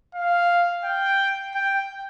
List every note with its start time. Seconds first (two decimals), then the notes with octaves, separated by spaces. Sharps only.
0.15 F5
0.84 G5
1.55 G5